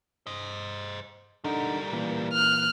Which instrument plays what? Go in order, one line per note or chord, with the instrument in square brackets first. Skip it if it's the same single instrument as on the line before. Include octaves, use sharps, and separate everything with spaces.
[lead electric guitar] C5 D#5
[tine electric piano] D3 D#4 [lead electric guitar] G3 A#4
[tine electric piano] A#2 E3 A#3
[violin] F6 F#6